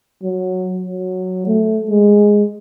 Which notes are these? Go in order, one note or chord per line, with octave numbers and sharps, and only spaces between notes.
F#3
F#3
A3
G#3